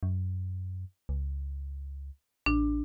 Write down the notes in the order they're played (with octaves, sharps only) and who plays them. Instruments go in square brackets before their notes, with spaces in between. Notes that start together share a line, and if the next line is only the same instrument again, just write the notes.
[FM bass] F#2
C#2
[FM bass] A1 [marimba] D4